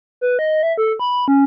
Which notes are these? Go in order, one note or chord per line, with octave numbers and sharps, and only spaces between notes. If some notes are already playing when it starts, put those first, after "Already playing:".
B4
D#5
E5
A4
B5
C#4